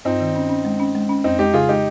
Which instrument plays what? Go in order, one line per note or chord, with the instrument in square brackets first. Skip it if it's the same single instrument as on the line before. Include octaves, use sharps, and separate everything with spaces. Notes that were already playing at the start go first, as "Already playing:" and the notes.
[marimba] G2 [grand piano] C4 D#4
[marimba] D#3
C#4
C#4
G#3
C#4
G#3
C#4
[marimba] F2 [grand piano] C4 D#4
[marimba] G#3 [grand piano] D#4 G4
[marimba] C#3 [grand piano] F4 G#4
[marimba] G#3 [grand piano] D#4 G4